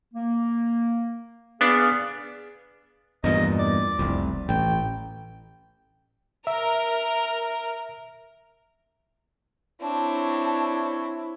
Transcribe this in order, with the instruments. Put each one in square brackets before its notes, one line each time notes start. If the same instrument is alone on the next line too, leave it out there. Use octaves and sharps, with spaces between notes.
[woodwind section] A#3
[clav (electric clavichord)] B3 D4 [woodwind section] G#4 F5
[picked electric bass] E2 G2 A#2 [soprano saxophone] D#5
[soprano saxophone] D5
[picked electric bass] F1 C2
[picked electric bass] A1 [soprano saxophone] G5
[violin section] A#4 [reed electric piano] E5
[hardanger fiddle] C4 D4 [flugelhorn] E4 [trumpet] C#5 [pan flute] A5